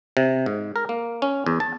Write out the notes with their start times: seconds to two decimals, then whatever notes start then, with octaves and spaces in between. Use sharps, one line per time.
0.17 C3
0.46 G#2
0.76 A#4
0.89 A#3
1.22 C#4
1.46 E2
1.60 A5